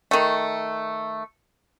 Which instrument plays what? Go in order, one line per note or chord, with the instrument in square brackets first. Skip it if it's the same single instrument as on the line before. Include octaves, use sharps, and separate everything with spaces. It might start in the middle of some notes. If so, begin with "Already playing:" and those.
[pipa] D#3 A3